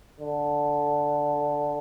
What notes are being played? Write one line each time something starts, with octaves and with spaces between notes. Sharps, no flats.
D3